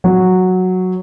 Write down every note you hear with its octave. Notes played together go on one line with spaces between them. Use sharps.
F#3